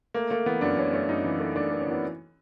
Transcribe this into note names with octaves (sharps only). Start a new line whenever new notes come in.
A3 A#3
A3 A#3
E3 B3
F#2 D4
F#2 C#4
A3 C#4
F#2 D#4
E3
A3
A3 D4
A3
C#4
E3 B3